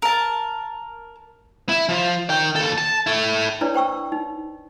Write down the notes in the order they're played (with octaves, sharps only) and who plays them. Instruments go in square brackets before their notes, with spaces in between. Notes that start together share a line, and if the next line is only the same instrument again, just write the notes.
[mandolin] A#4 A5
[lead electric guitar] E4
F3
D#3 G5
D#2 A4
A5
E4 A4
[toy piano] D4 E4 B4 C#5 D5 A#5
C5 G5 C#6 E6
D#4